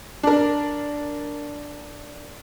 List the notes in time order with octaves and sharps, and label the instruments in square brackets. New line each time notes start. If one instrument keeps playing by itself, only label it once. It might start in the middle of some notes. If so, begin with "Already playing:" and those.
[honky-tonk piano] D4 A#4